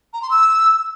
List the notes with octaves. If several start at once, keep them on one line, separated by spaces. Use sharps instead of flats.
A#5
C6
E6